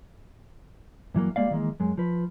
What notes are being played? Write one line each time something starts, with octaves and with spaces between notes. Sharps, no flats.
G2 E3 F#3 A#3
G3 G#3 A#3 D5 F5
D#3 E3 G#3 A#3
F#2 G#3
F3 B4